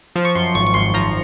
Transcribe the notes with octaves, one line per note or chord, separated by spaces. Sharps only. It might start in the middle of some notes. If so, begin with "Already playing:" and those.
F3
C#6
F#2 C6
G#1 C#6
C#6
G#1 C6
F3 A#5